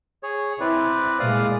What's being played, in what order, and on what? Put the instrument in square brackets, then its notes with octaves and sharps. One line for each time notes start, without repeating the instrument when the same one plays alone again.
[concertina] G#4 C#5
[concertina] C4 B4 D5 [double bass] E4
[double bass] A#2 G#3 [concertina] D5 F5 D#6